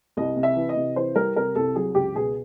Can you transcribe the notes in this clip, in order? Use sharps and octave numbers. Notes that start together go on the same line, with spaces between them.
C2 D#5
C3
E5
E3
D#5
C3
E3 C5
G3 A#4
C3 A#4
C2 A4
F#3 G#4
C#2 G4
B2 G#4